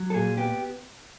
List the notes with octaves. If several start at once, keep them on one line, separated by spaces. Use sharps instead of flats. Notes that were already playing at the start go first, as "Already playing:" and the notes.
Already playing: F#3
A4
A#2 G#4
B3 G4